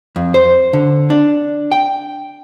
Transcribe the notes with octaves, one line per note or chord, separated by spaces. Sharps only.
F2
C5
D3
D4
G5